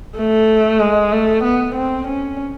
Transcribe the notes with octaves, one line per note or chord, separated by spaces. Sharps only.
A3
G#3
A3
B3
C4
C#4